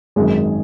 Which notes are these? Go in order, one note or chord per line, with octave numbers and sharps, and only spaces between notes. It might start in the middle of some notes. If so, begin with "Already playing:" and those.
G#1 F#2 D#3 G#4